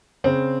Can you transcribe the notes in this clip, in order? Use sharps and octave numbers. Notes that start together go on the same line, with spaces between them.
C#3 C4